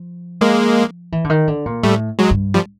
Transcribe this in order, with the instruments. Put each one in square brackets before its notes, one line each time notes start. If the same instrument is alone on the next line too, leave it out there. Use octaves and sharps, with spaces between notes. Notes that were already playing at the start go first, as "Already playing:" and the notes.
Already playing: [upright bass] F3
[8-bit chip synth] G#3 A#3
[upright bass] E3
D3
D#3
D3
A#2
[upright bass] A2 [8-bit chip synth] G3 A3
[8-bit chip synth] F#3 G#3
[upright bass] G2
[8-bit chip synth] F3 G3